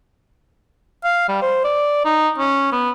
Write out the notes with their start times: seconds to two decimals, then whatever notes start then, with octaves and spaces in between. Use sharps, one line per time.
1.04 F5
1.29 G3
1.42 C5
1.64 D5
2.05 D#4
2.38 C#4
2.72 B3